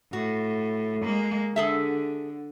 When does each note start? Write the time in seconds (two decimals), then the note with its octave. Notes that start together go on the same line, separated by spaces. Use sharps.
0.13 A2 F#4
1.04 G#3 A#3
1.56 D3 G#4 A4 E5